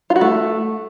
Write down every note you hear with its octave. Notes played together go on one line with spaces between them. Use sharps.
F4
F#4
A3